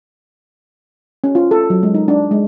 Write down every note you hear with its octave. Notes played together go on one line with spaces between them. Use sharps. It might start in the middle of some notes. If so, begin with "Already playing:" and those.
C#4
F4
A4
F#3
G#3
D#4
D4
G#3